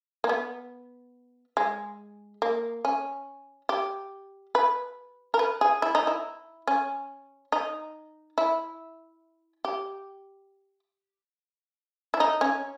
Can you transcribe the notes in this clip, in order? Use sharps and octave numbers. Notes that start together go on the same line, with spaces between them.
A#3
B3
G#3
A#3
C#4
G4
B4
A#4
B4
G#4
E4
D#4
E4
C#4
D#4
E4
G4
E4
D#4
C#4